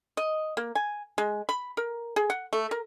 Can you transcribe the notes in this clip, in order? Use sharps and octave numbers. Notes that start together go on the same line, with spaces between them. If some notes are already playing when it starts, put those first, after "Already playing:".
D#5
A#3
G#5
G#3
B5
A#4
G#4
F#5
A3
A#4